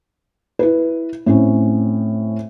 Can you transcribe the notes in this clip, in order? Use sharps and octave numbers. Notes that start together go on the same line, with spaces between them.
E4 B4
A2 C4 C#4